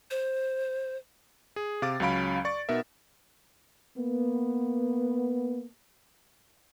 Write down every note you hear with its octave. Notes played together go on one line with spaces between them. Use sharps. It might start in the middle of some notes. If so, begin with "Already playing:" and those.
C5
G#4
C3 F5 D6 A6
C#2 F#3 C#4 F5 B5 D7
D5 C#6 A6
B2 B3 D#4 A#4 E5
A#3 B3